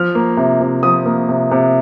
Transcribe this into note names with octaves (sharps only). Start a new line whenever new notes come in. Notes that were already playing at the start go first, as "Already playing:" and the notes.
Already playing: F3 F6
A#3
C3
C3
F3 D#6
A#3
C3
C3